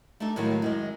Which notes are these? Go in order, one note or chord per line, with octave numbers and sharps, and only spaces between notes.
A3 D4 D#4 G4 A4
A2 D#3 F#3 G#3 A#3 D#4
F#2 D#3 G#3